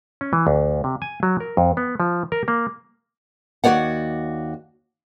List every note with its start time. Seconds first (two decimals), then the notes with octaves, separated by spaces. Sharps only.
0.21 C#4
0.33 E3
0.47 D2
0.84 C3
1.02 G#5
1.23 F#3
1.40 A#4
1.57 F2
1.77 B3
2.00 F3
2.32 A#4
2.48 A#3
3.64 D#2 F#4 G4 C#5 D5 F#5